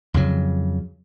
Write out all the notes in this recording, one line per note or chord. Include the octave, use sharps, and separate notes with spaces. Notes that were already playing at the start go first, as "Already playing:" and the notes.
F2 C#3 F#3